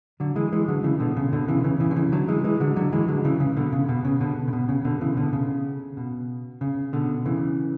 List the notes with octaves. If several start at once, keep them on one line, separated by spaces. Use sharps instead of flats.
D3 F#3
E3 G#3
E3 G#3
D3 F#3
C#3 E3
B2 D3
C#3
B2 D3
C#3 E3
C#3 E3
C#3 E3
D3
C#3 E3
D3 F#3
E3 G#3
E3 G#3
D3 F#3
D3 F#3
E3 G#3
D3 F#3
C#3 E3
C#3
B2 D3
C#3
B2
C#3
B2 D3
C#3
B2
C#3
B2 D3
C#3 E3
B2 D3
C#3
B2
C#3
B2 D3
C#3 E3